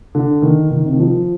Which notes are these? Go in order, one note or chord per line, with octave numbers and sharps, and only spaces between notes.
D3
D#3
D#3
C3
D#3
F3